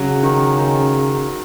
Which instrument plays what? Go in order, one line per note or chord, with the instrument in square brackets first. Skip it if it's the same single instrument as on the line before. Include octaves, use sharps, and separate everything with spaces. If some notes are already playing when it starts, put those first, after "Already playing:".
Already playing: [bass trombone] C#3 [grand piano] F#3
[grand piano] D#3
D#3